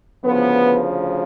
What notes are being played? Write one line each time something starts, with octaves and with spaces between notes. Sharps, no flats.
D2 C#3 F3 B3